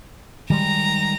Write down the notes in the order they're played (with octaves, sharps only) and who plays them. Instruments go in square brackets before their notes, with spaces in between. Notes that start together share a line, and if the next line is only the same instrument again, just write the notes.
[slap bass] D#3 G3 G#3 [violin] A#5